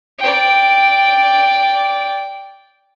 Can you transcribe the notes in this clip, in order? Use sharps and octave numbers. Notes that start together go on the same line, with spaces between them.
D5 G5